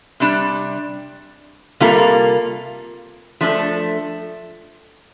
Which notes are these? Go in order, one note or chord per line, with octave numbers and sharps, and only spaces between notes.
C3 G3 D4
C3 G3 A#3 F4 A4
F3 A3 D4 A4